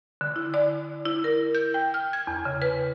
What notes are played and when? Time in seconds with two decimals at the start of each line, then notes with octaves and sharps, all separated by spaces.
0.21 D3
0.36 E4
0.54 D5
1.05 E4
1.24 A#4
1.55 G6
1.74 G5
1.94 F6
2.13 G#6
2.27 E2
2.45 C#3
2.62 B4